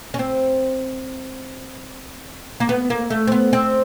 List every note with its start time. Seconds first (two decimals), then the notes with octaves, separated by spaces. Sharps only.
0.14 C#4
0.19 C4
2.60 A#3
2.69 B3
2.90 A#3
3.10 A3
3.27 C4
3.32 B3
3.53 C4